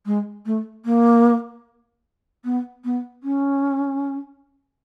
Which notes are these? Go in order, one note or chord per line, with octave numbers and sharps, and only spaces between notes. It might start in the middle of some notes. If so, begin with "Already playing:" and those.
G#3
A3
A#3
B3
B3
C#4